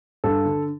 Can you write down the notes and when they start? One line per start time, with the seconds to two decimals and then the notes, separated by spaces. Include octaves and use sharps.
0.24 G2 A4
0.45 D3